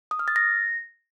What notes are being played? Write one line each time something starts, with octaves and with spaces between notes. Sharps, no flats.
D#6
F6
A6
A#6